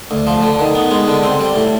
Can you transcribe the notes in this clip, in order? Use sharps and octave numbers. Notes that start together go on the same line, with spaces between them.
D2
F3
D3
D#3
B3
G#3
D3
C4
G3
A2